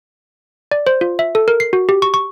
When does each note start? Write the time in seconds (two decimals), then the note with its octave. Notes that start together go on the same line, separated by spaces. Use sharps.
0.72 D5
0.87 C5
1.01 F4
1.19 E5
1.35 A4
1.48 A#4
1.60 C7
1.73 F#4
1.89 G4
2.02 C#6
2.14 C#6